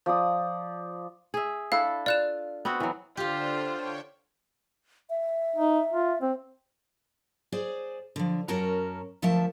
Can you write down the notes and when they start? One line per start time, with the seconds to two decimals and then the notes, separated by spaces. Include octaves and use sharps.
0.06 F3 D5 D#6
1.34 G#4 E5
1.72 D4 E4 A4 F5
2.06 F4 D5 F5 F#6 E7
2.65 B3 C4 F#4
2.80 E3 F#3
3.17 D3 D4 F4 G4 C5 F5
3.67 C#5 G5
5.10 E5
5.56 D#4
5.93 F4
6.22 C4 C5
7.52 G#4 C5 D5 G#5
8.16 D3 F3
8.48 F#2 C#4 F#4 A#4 A5 A#5
9.22 D2 F3 A3 A#4 E5 A5